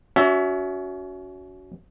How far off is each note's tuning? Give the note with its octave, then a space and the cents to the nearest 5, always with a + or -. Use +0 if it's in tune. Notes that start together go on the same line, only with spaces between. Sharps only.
C#4 +30 F#4 +0 E5 +0